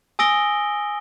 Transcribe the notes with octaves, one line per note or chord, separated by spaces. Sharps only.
G#5 D#6 E6 A#6 D7 G7